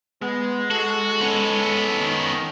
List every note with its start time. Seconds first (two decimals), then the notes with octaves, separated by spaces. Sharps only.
0.22 G#3 B3
0.71 F#4 A4
1.21 B3 C#4
2.02 D#3